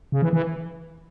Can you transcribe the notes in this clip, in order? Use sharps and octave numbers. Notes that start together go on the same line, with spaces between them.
C#3
E3
E3